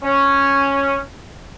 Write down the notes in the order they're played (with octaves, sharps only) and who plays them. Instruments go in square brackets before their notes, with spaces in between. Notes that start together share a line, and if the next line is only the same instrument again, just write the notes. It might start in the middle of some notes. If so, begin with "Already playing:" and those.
[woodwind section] C#4